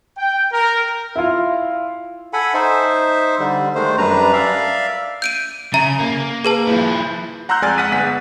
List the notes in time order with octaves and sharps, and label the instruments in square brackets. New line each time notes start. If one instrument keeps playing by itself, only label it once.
[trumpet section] G5
A#4
[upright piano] E4 F4
[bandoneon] A4 F#5 G#5 B5
D#4 C5 E5
D3 G3
D#3 G#3 A3 C5
F#2 G3 D4 B4 A#5
D5 E5 F5
[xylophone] G6 D7 D#7
[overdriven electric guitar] C#3 [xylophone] E5 A#5
[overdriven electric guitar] A#3
[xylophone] G#4 B4 A5
[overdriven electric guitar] F3 E4
[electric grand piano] F#5 A#5 C6 E6 F#6 G6
F2 G#3 D5 G#5 F6 A6
F#5 F6 F#6 A6 B6 D#7
G1 B3 F#5 B6
G#4